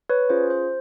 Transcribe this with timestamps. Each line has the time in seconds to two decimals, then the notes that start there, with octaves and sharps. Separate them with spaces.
0.10 B4 C#5
0.30 C#4 F4 G#4 C5
0.50 C5